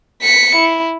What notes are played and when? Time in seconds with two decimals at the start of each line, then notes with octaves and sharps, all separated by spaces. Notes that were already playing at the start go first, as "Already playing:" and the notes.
0.23 B6 C#7
0.56 E4